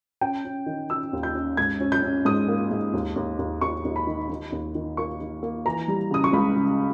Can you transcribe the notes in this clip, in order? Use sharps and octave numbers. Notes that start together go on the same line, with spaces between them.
C#4 G5
C#4
D#3
C#4 E6
D#2
G6
C#4
G#2 G#6
C#4
G6
C#4
G#2 D#6
A#3
G#2
D#2
D#2
D#2
D#2 C#6
D#2
B5
D#3
D#3
D#2
D#3
A#3 C#6
D#3
A#3
E3 A#5
G3
C#3 D#6
C#6
C#2 B5
C#3